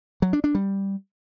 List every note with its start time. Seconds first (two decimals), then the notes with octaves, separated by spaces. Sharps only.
0.22 F#3
0.33 D4
0.44 D4
0.55 G3